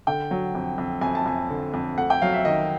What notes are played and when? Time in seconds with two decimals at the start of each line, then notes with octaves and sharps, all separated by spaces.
0.07 D3 G5
0.31 F#3
0.55 F2
0.78 F2
1.01 F2 G#5
1.15 A5
1.26 F2 G#5
1.50 D3
1.74 F2
1.97 A3 F#5
2.10 G5
2.21 F#3 F5
2.33 E5
2.45 D#3 D#5